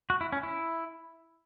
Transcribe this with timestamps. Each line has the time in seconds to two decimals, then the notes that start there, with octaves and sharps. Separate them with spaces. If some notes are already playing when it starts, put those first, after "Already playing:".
0.10 F#4
0.21 E4
0.32 C#4
0.43 E4